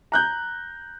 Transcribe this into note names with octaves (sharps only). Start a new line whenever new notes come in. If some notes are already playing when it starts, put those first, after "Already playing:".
A#5 F#6 G6